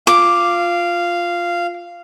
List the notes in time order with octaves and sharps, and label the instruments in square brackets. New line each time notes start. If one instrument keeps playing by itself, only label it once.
[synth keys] F4 [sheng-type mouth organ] F5 [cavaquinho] D6